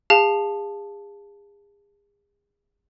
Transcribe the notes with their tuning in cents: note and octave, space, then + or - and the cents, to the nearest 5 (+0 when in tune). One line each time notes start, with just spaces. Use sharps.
G#4 -35 F5 +5 A5 +0